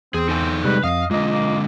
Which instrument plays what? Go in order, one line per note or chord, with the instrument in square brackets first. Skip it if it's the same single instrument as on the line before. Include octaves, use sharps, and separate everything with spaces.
[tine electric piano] E2 [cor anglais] C4 [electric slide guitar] G#4
[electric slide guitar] D#4 A4 G#5
[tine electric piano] C3 G3 G#3 [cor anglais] B4
[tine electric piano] F2 [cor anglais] D#5 [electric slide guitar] F5
[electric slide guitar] D3 G#3 [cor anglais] A#3 [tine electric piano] F4 D#5
[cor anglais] A#3